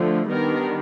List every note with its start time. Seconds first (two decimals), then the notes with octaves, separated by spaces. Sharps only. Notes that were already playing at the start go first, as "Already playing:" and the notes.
Already playing: D3 F3 A3
0.28 D#3 G3 B3 D4 A#4